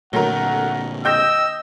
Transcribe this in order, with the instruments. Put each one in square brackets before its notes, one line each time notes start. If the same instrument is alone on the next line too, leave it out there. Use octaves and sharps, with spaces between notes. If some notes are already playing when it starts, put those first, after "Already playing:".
[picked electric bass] A#2 D3 [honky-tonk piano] F#3 A3 A#4 [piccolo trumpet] F#5
[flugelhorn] D#5 [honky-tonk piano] G5 G6 A#6 [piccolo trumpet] E6